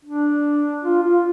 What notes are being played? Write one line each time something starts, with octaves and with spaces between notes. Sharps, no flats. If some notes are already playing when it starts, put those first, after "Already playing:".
D4
F4
F4